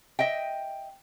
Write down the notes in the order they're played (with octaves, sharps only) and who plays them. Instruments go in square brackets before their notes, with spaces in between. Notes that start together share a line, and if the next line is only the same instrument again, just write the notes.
[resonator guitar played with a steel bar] D#5 E5 G5